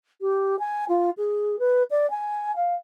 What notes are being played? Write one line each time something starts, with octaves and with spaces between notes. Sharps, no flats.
G4
G#5
F4
G#4
B4
D5
G#5
F5